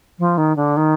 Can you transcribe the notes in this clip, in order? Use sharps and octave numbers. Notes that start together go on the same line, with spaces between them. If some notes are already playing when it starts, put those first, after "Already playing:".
F3
D#3
D3
D#3